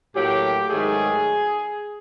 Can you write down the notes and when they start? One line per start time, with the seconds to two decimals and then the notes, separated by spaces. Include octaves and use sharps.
0.16 A2 F#3 A#3 G4
0.69 G#2 D#3 F#3 A3 G#4